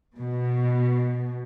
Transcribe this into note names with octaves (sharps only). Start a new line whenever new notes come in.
B2